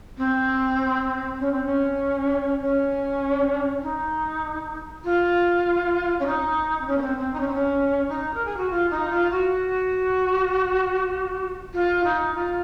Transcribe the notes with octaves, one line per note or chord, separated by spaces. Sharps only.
C4
C#4
C4
C#4
C#4
D#4
F4
C#4
D#4
C4
C#4
A#3
C4
C4
D#4
C#4
C4
C#4
D#4
A#4
G#4
F#4
F4
D#4
F4
F#4
F4
D#4
F4